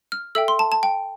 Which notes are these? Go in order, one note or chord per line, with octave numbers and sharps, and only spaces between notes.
F6
A4 E5 G5 E6
C6
A5
A5
G5